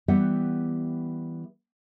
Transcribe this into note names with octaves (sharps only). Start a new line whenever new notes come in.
E3 G3 B3 G4 E5 F#5